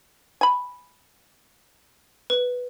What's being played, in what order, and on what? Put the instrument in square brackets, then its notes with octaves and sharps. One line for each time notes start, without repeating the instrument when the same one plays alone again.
[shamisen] G#5 B5
[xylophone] B4